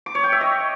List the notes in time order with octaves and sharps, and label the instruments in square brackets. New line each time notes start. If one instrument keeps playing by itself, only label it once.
[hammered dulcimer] D6
C#5
G5
E5
D#5